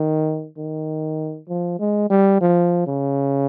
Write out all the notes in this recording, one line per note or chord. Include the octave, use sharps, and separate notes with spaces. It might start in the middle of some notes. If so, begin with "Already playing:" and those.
Already playing: D#3
D#3
F3
G#3
G3
F3
C#3